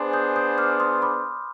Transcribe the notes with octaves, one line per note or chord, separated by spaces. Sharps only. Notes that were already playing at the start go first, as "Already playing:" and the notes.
Already playing: B3 D4 G#4 C5 G#5 C6
D#6 G6
D#6 G6
D6 F6
C6 D#6
B5 D6